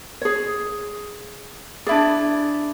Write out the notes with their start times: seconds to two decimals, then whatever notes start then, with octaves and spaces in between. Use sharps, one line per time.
0.21 G#4 C#5
1.87 D4 E4 G#4 D5